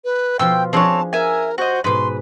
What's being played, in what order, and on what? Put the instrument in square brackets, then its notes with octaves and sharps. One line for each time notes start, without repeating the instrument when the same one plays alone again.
[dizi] B4
[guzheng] B2 F3 F4 [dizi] G5 [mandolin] E6
[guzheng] F3 D4 G#4 [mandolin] C4 C#5 [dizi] A5
[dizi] A#4 [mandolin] E5 G#5
[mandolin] F#4 D#5 [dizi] C5
[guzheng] G#2 B2 [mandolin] B4 [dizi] C6